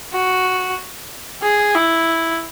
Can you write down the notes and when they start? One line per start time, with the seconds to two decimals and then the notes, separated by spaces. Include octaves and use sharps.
0.13 F#4
1.43 G#4
1.75 E4